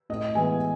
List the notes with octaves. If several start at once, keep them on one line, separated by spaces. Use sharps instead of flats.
A2 D#5
E3 G#3 B3 G#5